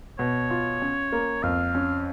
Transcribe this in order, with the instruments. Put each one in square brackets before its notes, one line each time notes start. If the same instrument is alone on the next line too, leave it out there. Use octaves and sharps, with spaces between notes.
[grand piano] B2 [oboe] C#5
[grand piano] F4
C#4
A#3
[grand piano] F2 [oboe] F5
[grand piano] C#4